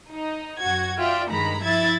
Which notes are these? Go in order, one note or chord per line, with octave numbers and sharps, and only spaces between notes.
D#4
F#2 F#4 G#6
F4 D5 E5 G5
G2 D#3 G#3 A#5 B5 B6
F3 E4 E5 G#6 A6